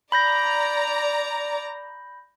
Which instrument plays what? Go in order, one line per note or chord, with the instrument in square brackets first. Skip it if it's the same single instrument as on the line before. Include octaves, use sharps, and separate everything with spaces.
[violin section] D5 A#5 [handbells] B5 G6 A#6